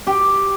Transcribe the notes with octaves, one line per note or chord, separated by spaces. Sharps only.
G4